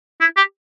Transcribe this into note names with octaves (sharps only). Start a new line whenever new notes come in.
E4
G4